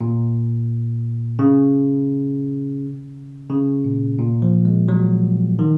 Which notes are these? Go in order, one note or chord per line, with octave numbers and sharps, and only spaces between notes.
A#2
C#3
C#3
A#2
A#2
F3
G#3
F#3
D#3